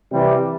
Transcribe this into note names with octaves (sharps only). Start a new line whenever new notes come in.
C3 E3 G3